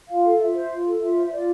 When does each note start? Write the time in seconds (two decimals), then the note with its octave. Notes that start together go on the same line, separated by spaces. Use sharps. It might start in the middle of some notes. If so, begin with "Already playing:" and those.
0.09 F4 F5
0.24 A4
0.39 F4 E5
0.55 C5
0.70 F4
0.85 A4
1.01 F4 E5
1.16 C5
1.32 F4 D5